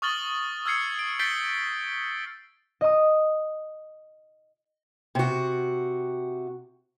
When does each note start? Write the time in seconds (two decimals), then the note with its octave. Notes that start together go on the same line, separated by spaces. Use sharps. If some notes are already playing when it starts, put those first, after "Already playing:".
0.02 C#6 D#6 F6 A6 F#7 G7
0.66 E6 F6 G#6 C7 C#7
0.99 D7
1.20 G6 A6 B6 C7 D7 G7
2.81 D#5 D#6
5.15 C3 F#4